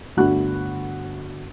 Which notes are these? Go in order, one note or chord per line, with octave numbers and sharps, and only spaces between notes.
G1 A3 D4 F#4 B5 F#6